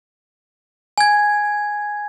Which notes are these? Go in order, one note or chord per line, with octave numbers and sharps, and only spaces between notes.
G#5 G#6